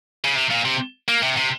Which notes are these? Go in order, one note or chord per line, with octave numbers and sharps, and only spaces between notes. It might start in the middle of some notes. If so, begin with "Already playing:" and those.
C#3
C3
A#2
C3
A#3
C3
C3